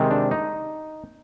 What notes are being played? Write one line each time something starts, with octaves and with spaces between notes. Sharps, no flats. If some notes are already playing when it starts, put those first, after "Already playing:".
Already playing: C3 D#3 G#3 C4
D4
D#4